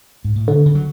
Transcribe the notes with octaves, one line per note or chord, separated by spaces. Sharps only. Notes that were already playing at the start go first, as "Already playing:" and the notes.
G#2
A2
B2 D3
C#3
F#3